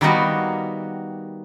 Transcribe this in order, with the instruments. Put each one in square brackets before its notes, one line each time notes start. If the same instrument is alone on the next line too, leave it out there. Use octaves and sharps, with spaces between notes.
[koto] D#3 G3 A#3 B3 D#4 F#4